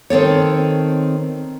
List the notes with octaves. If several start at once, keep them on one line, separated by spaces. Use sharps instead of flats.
D#3 C4 A4 C#5